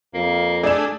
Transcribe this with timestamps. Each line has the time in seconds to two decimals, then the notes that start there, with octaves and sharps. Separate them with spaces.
0.14 F2 A#3
0.63 A3 D4 G#4 D5 E7